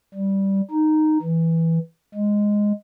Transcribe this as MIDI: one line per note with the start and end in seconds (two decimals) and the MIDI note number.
0.14 0.61 55
0.71 1.18 63
1.22 1.78 52
2.15 2.72 56